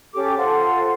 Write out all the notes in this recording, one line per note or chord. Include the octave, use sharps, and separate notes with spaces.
C#4 G4 A4 D6
F4 A4 C5 F#5